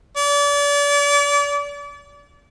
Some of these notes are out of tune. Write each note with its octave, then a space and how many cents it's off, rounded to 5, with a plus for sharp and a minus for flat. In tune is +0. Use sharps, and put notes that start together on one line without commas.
D5 -35